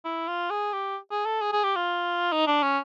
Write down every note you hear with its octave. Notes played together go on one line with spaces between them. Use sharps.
E4
F4
G#4
G4
G#4
A4
G#4
G#4
G4
F4
D#4
D4
C#4